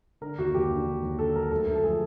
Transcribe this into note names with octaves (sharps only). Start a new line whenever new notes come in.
D3 A#4
D#2 F#4
D#2 G4
D3
D#2
D#2
D3 A4
F#3 A#4
D2 A4
D2
A4
F3 G#4